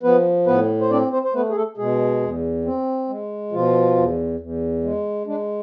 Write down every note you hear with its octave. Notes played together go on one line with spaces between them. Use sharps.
F3 B3 B4
A2 B3 B4
C5
C4 D4 D5
C4 C5
C5
A3 B3 B4
G#4
A3 A4
B2 G#3 G#4
E2
C4
G#3
B2 F3 F4
E2
E2
G#3
G#3 D4